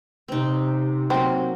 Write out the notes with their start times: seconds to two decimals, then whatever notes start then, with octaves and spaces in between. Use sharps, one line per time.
0.28 C3 C4 D#4
1.10 F#3 A#3 C4